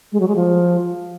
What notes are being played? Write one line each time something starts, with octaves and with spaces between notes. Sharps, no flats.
G#3
F#3
G#3
F3